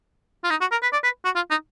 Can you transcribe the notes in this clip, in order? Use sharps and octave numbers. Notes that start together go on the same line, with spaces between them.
F4
D#4
F#4
A#4
B4
D5
B4
F#4
F4
D#4